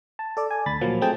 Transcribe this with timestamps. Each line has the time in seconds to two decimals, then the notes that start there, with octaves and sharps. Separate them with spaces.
0.19 A5
0.37 A4 D5
0.51 G#5
0.66 D2 B5 A6
0.81 A#2 F3 F#3 A#3
1.01 A3 C4 G#4 G5 A5